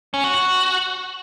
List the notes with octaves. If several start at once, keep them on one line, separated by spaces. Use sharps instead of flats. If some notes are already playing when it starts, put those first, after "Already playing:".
C#4
F#4
F#4